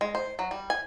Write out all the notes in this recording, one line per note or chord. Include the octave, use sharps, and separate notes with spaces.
G#3
C5
F#3
G3
G#5